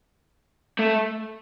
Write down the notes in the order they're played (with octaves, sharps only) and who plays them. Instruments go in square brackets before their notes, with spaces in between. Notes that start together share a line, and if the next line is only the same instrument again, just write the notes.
[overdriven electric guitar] A3